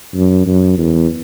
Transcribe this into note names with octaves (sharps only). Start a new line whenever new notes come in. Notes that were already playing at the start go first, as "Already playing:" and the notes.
F#2
F#2
E2